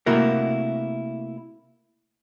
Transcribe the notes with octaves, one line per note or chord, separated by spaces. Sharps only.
C3 A3 A#3 E4 F#4 A#4